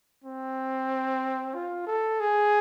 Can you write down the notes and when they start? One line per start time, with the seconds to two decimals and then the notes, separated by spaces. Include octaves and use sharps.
0.24 C4
1.54 F4
1.87 A4
2.20 G#4